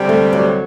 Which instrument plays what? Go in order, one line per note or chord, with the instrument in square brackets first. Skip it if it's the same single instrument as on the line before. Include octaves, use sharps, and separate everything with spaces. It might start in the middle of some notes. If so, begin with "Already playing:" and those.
Already playing: [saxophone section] D2 C3 G3
[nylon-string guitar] A3
F#3